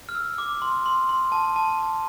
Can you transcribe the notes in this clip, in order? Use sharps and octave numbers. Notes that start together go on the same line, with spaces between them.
F6
E6
D6
C6
C6
C6
A5
A5
A5